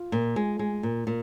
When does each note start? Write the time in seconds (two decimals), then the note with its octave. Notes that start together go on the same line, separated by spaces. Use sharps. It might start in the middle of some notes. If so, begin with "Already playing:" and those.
Already playing: F4
0.12 A#2
0.36 G#3
0.59 G#3
0.83 A#2
1.07 A#2